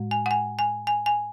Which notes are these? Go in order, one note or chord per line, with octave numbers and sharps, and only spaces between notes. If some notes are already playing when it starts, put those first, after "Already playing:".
Already playing: A2 G#3
G#5
F#5
G#5
G#5
G#5
G#5